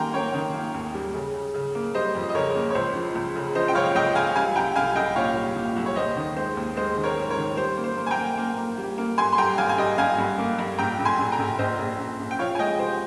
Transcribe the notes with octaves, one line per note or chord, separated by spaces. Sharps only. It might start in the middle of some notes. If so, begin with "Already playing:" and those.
Already playing: D#3 G3 A#3 G5 G#5 A#5 C6
A#3 A#4 C#5
D#3
A#3
D#2
G3
C#3
C#3
C#3
A#3
G3 C5 D#5
F2
D#5
C#3 A#4 C#5
A#3
C#5
C#2 C5
F3
C#2
C#3
F3 C5 D#5
G5
C#2 C#5 F5
C#2 D#5 G5
C#2 F5 G#5
G3 F5 G#5
C2 G5 A#5
C2 F5 G#5
C2 D#5 G5
A#2 C#5 F5
G3
A#2
C2
C#5
D#2 C5 D#5
D#3
G#3 C5
D#2
G#3 C5 D#5
D#3
A#4 C#5
G#3
A#4 C#5
D#3
G3 C5
A#3
C5
A#3
G#5
G5 A#5
A#3
A#3
A#3
G3
A#3
G2 G#5 C6
C6
G3 G5 A#5
G#1 F5 G#5
G#5
G3 D#5 G5
G2 F5 G#5
G2
A#3
G2
A#1 G5 A#5
A#1
G#5 C6
A#1
G5 A#5
A#1
A#1 C5 D#5
A#1
A#1
A#1
G5
F3 C#5 F5
G#5
G#3 D#5 G5
C3 C5